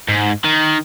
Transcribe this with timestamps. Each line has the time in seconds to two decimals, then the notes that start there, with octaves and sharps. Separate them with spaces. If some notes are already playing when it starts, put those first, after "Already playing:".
0.08 G#2
0.44 D#3